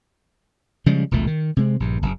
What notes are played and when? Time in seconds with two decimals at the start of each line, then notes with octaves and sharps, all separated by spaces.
0.86 C#3 F3 G3 G#3
1.11 E1 C2 A#2 A3
1.27 D#3
1.57 C3 G#3 C4
1.80 A#1 G2
2.02 F#1